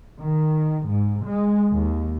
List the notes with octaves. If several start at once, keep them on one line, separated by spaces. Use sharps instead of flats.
D#3
G#2
G#3
D#2